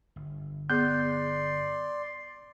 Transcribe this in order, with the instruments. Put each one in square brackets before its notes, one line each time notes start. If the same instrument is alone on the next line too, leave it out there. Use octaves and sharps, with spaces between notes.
[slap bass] G1
[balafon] B3 G#4 [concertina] D5 C6 [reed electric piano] G6